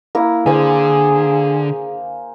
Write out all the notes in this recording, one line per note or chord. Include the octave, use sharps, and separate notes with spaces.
A#3 E4
D3 G#4 C5 F5 G#5